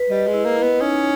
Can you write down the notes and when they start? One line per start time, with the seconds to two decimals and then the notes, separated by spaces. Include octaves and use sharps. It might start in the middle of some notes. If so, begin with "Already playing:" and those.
Already playing: B4
0.10 G3 D#5
0.27 G#3
0.34 E4
0.45 A#3
0.56 E4
0.63 B3
0.80 C#4 D#4